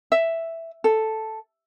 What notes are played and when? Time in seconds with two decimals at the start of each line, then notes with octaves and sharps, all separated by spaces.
0.12 E5
0.84 A4